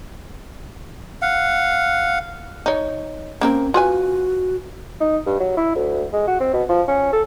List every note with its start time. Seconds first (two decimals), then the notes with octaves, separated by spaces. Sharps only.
1.22 F5 F#5
2.66 D#4 C#5
3.41 A#3 C4 C#4 A#4
3.74 F4 F#4 B4 G#5
5.00 D#4
5.26 G2
5.40 F#3
5.57 E4
5.75 D2
6.13 G#3
6.27 F#4
6.40 C4
6.53 B2
6.69 F3
6.88 C#4
7.13 A4